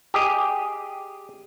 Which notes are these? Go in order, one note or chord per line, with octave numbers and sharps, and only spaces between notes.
G4 G#4 D#5